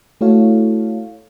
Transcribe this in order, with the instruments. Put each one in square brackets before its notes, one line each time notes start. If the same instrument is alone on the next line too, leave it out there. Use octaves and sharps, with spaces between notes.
[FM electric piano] A3 E4 F#4 A4 C#5 F5